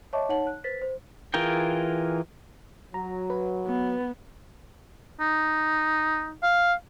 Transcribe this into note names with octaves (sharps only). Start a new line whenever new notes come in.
C#5 D#5 E5 A5 C#6 D6
D#4 C#5 F#5 A5 F#7
F#6
B4 C5 A6 B6
C5
E3 F4 G#4 A#4 G5
F#3 A#5
B4
B3
D#4
F5